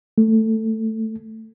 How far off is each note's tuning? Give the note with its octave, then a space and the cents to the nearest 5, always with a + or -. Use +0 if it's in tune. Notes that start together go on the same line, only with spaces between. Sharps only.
A3 +10